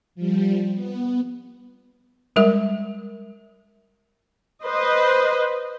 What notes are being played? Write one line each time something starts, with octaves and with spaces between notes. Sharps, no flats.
F3 G3
B3
G3 G#3 A#4 E5
B4 C5 D#5